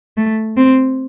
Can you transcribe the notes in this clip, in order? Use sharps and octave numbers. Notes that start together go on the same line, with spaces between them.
A3
C4